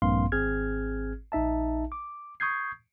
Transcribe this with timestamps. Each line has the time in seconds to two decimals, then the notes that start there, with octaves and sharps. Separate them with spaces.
0.02 A#1 G2 A#3 C4 F5 C6
0.32 G#1 C4 G#4 F6 G#6
1.32 A#1 D#4 E5 A5
1.92 D6
2.40 C#6 D#6 G6 G#6 C7